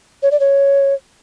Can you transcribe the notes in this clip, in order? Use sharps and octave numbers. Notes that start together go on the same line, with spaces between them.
C#5
D5
C#5